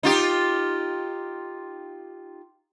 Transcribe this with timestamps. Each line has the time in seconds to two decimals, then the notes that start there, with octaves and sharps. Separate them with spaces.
0.03 D#4 F4 G4